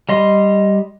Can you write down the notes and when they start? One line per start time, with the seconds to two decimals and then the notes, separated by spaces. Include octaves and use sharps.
0.09 G3 D#5 C6